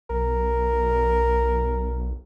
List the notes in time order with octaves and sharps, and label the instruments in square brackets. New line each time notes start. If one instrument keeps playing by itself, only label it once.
[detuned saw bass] B1 [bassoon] A#4